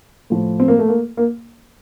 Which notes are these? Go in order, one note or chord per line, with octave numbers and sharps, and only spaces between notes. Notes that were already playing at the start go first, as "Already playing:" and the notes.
A2 F3
C4
A#3
A3
A#3
A#3